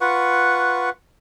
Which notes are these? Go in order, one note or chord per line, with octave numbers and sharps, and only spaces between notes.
F4 B4 F#5 C#6